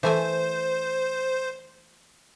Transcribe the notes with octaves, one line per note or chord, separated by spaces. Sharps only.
E3 A3 C5 G#5